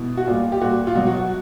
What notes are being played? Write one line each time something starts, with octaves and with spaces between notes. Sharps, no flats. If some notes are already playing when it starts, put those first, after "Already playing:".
Already playing: B2 E4
F#4
A#2 G3 F4
G4
A#2 G3 F#4
F4
B2 F#3 F#4
F#4
F#4